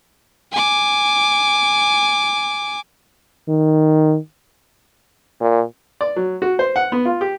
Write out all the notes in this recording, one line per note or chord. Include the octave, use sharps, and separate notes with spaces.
G#5 D6
D#3
A#2
D5
F#3
F#4
C5
F#5
B3
F4
G4